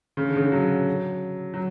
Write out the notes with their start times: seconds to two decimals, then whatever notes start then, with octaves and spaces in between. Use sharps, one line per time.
0.17 C#3
0.28 D3
0.36 C#3
0.40 D3
0.52 F#3
1.54 F#3